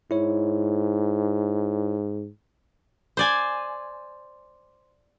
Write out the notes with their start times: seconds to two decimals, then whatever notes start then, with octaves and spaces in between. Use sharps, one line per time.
0.11 G#2 E4 C#5
3.17 C5 D5 G#5